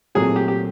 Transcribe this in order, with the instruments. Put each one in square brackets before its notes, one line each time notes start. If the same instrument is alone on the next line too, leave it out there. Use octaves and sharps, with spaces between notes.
[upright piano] C2 A#2 F#3 A3 C4 [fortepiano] G#4
[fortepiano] G4
G4